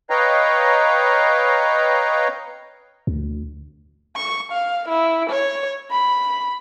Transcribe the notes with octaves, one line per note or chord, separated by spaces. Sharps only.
B4 C#5 D#5 F5 G5 A#5
D2
C#6
F5
E4
C#5
B5